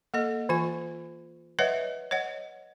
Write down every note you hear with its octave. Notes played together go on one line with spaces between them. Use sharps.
A#3 A4 D#5
E3 F4 G#5
B4 C#5 D#5 E5 F#5
C#5 D#5 F#5